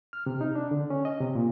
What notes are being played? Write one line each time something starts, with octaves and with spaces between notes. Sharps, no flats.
F6
C3
D#4
D4
D3
C#4
D#5
C3
A#2